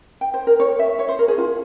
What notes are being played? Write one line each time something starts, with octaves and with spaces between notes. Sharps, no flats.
G5
C5
A#4
C#5
E5
C#5
C5
A#4
G#4
F4